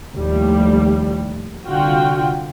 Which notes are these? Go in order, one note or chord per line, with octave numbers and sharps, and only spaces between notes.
D#2 A2 F3 G3
C2 D3 F4 F#4 G5